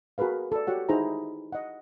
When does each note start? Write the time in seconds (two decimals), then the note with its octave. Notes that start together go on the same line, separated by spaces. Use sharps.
0.18 F#4 G#4 A#4 B4 F5
0.52 A4 D5
0.67 F#4 G4 C#5 F#5
0.89 D#4 E4 G#4 C5 A#5
1.53 D#5 F#5